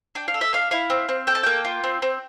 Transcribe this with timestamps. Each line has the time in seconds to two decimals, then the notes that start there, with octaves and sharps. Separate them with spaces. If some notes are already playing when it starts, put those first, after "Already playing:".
0.15 D4 G5
0.28 F5
0.34 A4
0.41 E5
0.53 D4 F5
0.71 E4 F5
0.90 C4
1.09 C4
1.27 A4 G5
1.35 A5
1.43 A#3 G5
1.65 F4
1.84 C4
2.02 C4